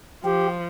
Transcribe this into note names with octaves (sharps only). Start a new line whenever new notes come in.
F3 G4